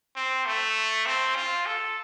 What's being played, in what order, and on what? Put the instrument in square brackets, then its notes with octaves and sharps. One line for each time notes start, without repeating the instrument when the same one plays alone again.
[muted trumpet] C4
A3
C4
F4
A4